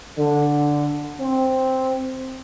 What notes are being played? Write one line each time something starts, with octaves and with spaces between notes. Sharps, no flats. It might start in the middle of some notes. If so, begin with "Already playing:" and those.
D3
C4